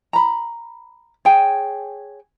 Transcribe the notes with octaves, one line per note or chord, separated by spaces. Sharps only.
A#5 B5
G#4 C#5 G5 G#5